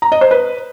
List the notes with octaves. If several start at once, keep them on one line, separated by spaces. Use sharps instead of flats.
A#5
D#5
C5
B4